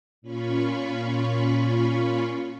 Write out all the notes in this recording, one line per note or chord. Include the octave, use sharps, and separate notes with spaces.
A#2 C#4 F4 B5 C#6